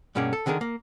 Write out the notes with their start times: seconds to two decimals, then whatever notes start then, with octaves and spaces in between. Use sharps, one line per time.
0.15 G2 B2 A#3 C#4 G#4 D5
0.33 A4
0.46 D3 D#3 D4 G#4 A#4
0.61 A#3